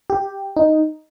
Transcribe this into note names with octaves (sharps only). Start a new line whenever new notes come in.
G4
D#4